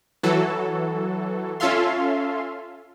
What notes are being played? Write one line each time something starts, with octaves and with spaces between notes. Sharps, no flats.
E3 F#3 F#4 A4
C#4 F4 A4 E5 F5 C6